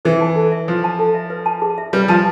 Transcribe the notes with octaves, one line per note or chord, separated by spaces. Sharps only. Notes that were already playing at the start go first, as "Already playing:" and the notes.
E3 C5
A5
A4
E5
F3 C5
A5
A4
E5
B4
A5
G#4
E5
G3 B4
F3 A5